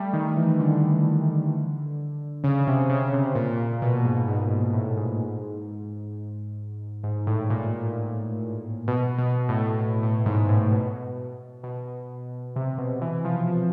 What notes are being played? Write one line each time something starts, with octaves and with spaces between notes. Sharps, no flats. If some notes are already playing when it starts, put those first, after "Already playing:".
Already playing: G3 A3
D#3
E3
D3
C#3
C3
C#3
C3
A#2
B2
G#2
G#2
G#2
A2
G#2
G#2
A2
A#2
B2
B2
A2
A2
A2
G#2
A2
B2
B2
C3
B2
E3
F3
F3